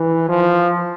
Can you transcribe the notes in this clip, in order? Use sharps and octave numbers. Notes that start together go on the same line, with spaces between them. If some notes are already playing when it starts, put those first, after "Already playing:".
Already playing: E3
F3